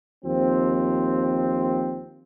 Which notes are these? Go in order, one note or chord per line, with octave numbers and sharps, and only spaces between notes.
D#2 F3 C4